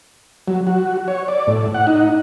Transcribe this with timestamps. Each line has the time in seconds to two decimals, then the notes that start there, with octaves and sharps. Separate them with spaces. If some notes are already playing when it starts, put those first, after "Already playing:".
0.48 F#3
0.67 F#4
1.08 C#5
1.28 D5
1.47 A2
1.74 F#5
1.87 D#4